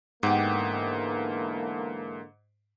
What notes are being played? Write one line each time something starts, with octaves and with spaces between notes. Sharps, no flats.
G#2 D3 E3 A#3 B3 G4